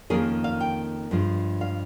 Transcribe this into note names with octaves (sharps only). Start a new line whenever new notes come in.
F2 D#3 A#3 C#4 G#4
F5
G5
G2 F3 G#3
F5